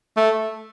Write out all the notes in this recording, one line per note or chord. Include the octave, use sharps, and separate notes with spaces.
A3